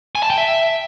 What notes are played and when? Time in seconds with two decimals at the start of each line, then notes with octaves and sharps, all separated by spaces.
0.15 G#5
0.23 A5
0.30 G5
0.38 E5